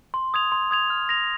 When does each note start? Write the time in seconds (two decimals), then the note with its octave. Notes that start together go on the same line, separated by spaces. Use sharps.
0.14 C6
0.34 D#6 G#6 F7
0.52 C6
0.71 D#6 G#6 F7
0.90 F6
1.09 A#6 F7